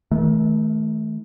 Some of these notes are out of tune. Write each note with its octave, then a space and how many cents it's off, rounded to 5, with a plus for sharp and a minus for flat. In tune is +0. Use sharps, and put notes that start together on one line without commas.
D#3 +35 A3 -20